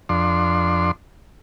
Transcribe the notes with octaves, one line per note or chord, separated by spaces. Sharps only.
F2 D4 C6